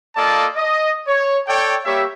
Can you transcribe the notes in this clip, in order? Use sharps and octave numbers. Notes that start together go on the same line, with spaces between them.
A#3 F4 A4 D5 D#5 A5
D#5
C#5
A4 C#5 D5 G5
G3 A#3 G4 C#5 E5